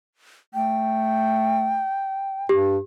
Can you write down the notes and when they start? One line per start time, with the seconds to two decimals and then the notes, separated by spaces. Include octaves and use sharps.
0.54 A3 G5
2.49 G2 G4